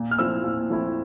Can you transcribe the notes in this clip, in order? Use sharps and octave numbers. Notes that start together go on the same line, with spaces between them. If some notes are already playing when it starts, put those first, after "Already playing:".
Already playing: A#2
F6
F3 A3 C4 E4 E6
A#2
F3 A3 C4 E4